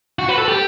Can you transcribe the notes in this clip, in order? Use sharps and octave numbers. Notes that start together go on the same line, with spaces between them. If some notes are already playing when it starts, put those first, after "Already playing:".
F#4
B4
A4
G4